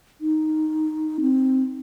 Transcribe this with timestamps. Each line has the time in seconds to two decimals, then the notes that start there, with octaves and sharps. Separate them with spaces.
0.21 D#4
1.21 C4